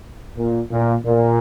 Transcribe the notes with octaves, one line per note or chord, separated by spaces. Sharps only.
A#2
A#2
A#2